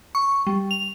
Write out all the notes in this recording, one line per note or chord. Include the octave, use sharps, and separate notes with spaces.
C#6
G3
F7